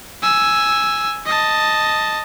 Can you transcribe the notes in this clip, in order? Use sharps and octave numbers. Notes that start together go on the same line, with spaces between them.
G#5 E6
D#5 A5